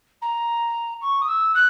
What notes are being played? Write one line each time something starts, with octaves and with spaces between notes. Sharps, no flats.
A#5
C#6
D#6
E6
F#6